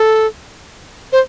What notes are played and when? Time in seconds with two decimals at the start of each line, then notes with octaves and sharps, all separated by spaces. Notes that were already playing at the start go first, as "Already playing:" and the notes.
Already playing: A4
1.12 C5